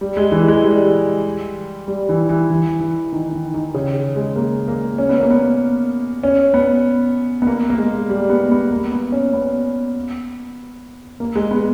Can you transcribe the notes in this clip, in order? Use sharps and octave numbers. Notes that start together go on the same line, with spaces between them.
G3
G#3
E3
G#3
G3
G3
E3
E3
E3
E3
D#3
D#3
D#3
C#3
G#3
A#3
A#3
C#4
B3
A#3
B3
C#4
B3
B3
A#3
A#3
G#3
G3
B3
B3
A#3
B3
C#4
B3
A#3
G#3
B3